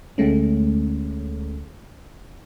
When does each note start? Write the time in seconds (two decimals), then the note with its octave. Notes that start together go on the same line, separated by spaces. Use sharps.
0.18 D2 G#3 A3 C#4